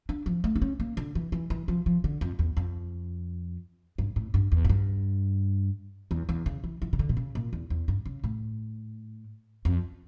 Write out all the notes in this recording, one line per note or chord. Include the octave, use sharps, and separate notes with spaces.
D4
F3
A3
D4
C#4
A#3
D3
E3
E3
E3
F3
F3
D3
F2
E2
F2
G2
A2
G2
E2
A2
G2
E2
E2
C#3
E3
E3
C#3
D3
A#2
C#3
A#2
E2
E2
G2
C#3
A2
F2